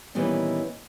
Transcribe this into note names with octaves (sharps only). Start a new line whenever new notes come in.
A#2 D#3 E3 G3 B3 C#4